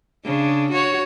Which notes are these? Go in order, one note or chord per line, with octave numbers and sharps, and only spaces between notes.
C#3 D4
F#4 C#5